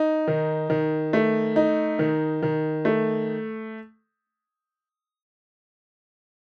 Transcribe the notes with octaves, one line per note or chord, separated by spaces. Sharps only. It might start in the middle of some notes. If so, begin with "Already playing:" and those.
Already playing: D#4
D#3
D#3
A3
D#4
D#3
D#3
A3